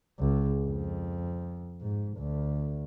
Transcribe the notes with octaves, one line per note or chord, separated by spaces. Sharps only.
C#2
F2
G#2
D2